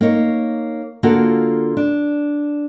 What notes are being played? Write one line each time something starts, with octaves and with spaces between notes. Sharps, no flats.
A#3 D#4 C#5
D3 A#3 F4 F#4 A4
D4